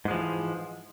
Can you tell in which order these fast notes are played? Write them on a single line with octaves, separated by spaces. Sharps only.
G#2 G#3 F3 E3